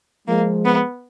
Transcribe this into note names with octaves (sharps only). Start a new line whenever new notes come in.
F3 G#3 A#3
B3